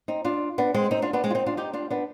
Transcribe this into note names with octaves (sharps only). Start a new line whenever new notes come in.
C4 D#4
D4 F4
B3 D4
G#3 C4
C4 D#4
D4 F4
B3 D4
G#3 C4
F4
C4 D#4
D4 F4
D#4 G4
D4 F4
B3 D4